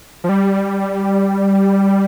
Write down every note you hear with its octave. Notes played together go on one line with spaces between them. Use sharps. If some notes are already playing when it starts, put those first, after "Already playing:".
F3
G3